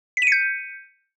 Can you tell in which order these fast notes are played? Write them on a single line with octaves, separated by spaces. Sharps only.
B6 D#7 C#7 G6